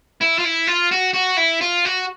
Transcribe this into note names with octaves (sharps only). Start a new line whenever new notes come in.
E4
F4
E4
F4
F#4
F#4
E4
F4
F#4